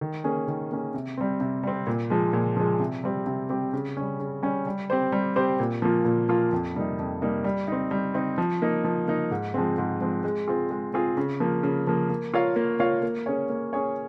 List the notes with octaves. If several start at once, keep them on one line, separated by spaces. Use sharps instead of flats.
D#3
A#3 C#4 G#4
D#3
A#3 C#4 G#4
C3
G3 C4
C3
G3 C4
A#2
F3 G#3
A#2
F3 G#3
C3
G3 C4 G4
C3
G3 C4 G4
C#3
G3 C#4
C#3
G3 C#4
G3
C4 G4 C5
G3
C4 G4 C5
A#2
F3 A#3 F4
A#2
F3 A#3 F4
F2
C3 G3 A#3 D#4
F2
C3 G3 A#3 D#4
G3
C4 D#4
G3
C4 D#4
F3
A#3 D#4
F3
A#3 D#4
G#2
F3 G#3 C4
G#2
F3 G#3 C4
G#3
C4 F4 G#4
G#3
C4 F4 G#4
C#3
F3 A#3
C#3
F3 A#3
A#3
F4 A#4 C#5 F5
A#3
F4 A#4 C#5 F5
A#3
C#4 G#4 C#5
A#3
C#4 G#4 C#5